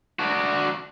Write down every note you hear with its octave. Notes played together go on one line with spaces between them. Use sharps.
D4 F#4